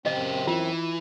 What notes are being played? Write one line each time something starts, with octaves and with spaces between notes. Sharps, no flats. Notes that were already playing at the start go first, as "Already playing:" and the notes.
F#2 C#3 C4 G4 D#5
E3 F4